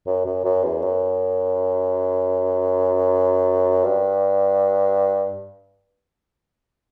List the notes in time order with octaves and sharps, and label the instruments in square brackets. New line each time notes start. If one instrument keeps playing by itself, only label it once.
[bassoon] F#2
F#2
F#2
E2
F#2
G2